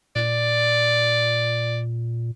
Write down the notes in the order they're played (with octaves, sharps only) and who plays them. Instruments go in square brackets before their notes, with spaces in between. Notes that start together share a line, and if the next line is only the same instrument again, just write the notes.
[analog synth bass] A#2 [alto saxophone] D5